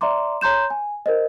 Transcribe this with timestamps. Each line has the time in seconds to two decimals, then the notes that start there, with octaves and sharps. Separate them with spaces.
0.01 D5 E5 A#5 C6 D6
0.41 C#5 A#5 C6 G6 E7
0.70 G#5
1.06 A#4 C5 D#5